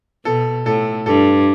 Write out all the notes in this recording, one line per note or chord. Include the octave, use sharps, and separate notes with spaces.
B2 A4
A2 A4
G2 A4